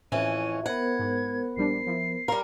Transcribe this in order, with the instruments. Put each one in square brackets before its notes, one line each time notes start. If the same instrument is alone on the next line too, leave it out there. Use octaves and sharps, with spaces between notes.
[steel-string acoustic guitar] F2 E3 C#4 [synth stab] A2 [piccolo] D#7
[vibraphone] B3 A#4 C5 [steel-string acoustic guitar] F#5 [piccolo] G#6
[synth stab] G#2
[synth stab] A#1 G3 D4 [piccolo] C7
[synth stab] F3 E4
[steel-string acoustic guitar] G3 A#4 [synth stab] F5 C6